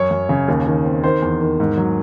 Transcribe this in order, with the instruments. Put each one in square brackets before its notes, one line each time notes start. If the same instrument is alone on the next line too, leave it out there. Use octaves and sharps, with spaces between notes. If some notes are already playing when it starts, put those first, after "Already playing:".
Already playing: [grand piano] F#2 C#5
F#2
C#3
D#2
D#3
C4
D#3 C5
E2
D#3
G#2
F#3